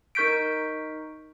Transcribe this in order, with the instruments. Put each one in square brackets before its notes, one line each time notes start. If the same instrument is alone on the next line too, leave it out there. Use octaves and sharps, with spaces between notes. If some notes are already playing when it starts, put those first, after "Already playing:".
[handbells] D#4 A#4 C#6 G6 B6 D7